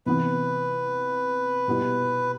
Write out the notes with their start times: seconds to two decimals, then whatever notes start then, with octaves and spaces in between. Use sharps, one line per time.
0.06 C3 E3 B3 B4
1.68 B2 G3 B3 E4